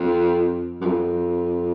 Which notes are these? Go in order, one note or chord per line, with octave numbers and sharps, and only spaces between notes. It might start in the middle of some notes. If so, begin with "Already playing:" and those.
Already playing: F2
F#2
F2